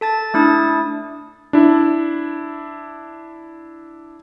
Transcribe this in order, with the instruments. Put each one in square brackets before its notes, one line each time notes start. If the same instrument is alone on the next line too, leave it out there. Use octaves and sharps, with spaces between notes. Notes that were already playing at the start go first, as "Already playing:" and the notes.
[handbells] A4 A5 A6
A3 D4 E4 D#6 A6
[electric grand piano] D4 E4